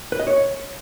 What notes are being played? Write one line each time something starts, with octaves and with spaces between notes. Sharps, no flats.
B4
D#5
C#5